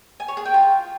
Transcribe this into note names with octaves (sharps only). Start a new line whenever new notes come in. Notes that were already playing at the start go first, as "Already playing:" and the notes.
G#5
C#5
G#4
G5
F4